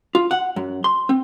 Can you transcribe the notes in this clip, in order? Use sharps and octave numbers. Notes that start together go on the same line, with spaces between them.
F4
F#5
F#2
C6
C4